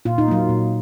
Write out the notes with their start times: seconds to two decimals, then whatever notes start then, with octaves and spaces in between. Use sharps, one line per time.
0.05 A#2 F4
0.18 D#4
0.28 F#3 A#3 F4
0.49 A#2